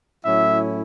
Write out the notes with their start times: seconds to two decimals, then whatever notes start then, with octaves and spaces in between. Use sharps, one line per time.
0.24 A2 F#3 C#4 E4 E5